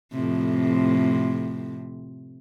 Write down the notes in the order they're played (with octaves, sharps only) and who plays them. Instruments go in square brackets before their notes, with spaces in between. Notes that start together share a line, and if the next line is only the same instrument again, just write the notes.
[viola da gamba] F2 A2 C3